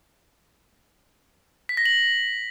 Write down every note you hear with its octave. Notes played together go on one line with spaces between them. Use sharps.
B6
A#6
F#7